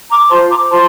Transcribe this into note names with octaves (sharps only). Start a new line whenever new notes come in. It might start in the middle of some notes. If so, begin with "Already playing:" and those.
A#5 D6
F4 C5 A5 C6
A#5 D6
F4 C5 A5 C6